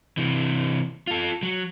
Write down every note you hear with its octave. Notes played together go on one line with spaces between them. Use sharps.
C3 E3
F4 A4
F#3